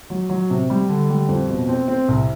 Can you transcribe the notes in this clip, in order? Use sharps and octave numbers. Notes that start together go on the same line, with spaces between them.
F#3
F#3
C3
G3
D3
G3
F2
B2
C4
C4
C2